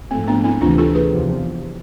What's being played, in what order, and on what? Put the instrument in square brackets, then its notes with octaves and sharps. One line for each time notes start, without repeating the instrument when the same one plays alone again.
[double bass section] G#2 F3 A3 [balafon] C4
[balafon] B3 D4
C4 E4
[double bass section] D2 C3 E3 A3 [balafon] D4 F4
[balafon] F4 A4
G#4 B4
[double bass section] E2 C3 F3